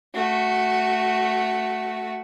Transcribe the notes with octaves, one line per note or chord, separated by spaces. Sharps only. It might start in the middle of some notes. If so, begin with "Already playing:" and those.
A3 F#4